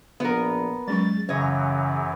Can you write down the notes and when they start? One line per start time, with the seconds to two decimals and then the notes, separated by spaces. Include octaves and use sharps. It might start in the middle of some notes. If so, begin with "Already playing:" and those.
0.20 A#1 B3 A#4
0.87 F#3 G#3 C#4 C#6 A6
1.29 F#2 C#3 E3 C#5 D#5